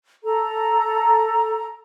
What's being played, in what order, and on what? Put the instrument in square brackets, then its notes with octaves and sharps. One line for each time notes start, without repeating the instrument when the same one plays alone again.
[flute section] A4 A#5